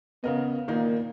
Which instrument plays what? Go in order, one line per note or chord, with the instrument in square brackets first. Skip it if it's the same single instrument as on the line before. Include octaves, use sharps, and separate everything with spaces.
[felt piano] C#3 A#4 D#5 [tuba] B3
[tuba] A#2 [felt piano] D#3 A#3 D#4